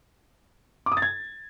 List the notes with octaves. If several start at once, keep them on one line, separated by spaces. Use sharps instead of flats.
D6
D#6
A6
G#6